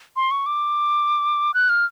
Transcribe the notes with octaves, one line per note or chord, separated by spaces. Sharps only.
C6
C#6
D6
F#6
F6